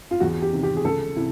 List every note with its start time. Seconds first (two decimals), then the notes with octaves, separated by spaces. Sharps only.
0.11 F4
0.20 E2 F#4
0.42 G4
0.53 C3 D#3
0.63 G4
0.76 G#4
0.84 C#2 A4
1.16 C3 E4